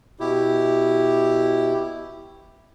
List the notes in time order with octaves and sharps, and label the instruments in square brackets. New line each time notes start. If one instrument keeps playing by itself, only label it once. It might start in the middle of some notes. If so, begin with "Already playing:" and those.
[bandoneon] B2 E4 G4